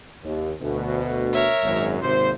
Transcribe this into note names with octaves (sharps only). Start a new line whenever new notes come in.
D#2
D2 B2
A#4 C#5 E5
G#1 F#2
G#1 D#2 C3 C5